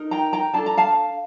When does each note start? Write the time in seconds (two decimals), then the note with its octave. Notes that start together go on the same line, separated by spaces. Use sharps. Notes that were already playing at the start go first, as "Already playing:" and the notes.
Already playing: D#4 A#4
0.11 G5 A#5
0.33 G5 A#5
0.54 D4 A4 A5
0.66 A#5
0.77 F5 A5